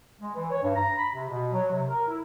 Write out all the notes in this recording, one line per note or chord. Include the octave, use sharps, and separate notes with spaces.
G#3
E3
C#5
G2
A#5
B5
C3
B2
F#3
C3
A#4
E4